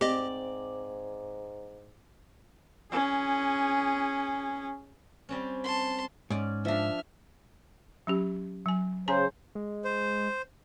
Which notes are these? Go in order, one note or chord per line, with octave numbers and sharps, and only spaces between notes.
G#2 C4 G4 D5 D#5
C#4 G#4
G3 C4 C#4
A5 C6
G#2 C#4 D5
F3 D4 E5 F6
F#3 C#4 G4
F#3 G#5
C#3 C5 C#5 G#5 A#5
G#3
C5